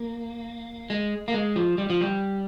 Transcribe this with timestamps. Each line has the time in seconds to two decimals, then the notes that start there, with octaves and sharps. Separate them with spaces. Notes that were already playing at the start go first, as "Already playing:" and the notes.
Already playing: A#3
0.90 G#3
1.28 A#3
1.34 G#3
1.56 F3
1.78 G3
1.90 F3
2.01 G3